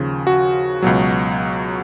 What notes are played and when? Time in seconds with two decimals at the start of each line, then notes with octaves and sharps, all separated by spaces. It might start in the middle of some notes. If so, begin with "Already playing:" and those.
Already playing: D#2 C#3 F3
0.27 F#4
0.82 C#2 B2 F#3